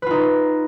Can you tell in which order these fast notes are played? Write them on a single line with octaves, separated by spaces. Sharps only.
B4 F4 D#4